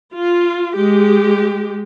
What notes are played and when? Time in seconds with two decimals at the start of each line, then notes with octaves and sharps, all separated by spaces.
0.14 F4
0.76 G#3 G4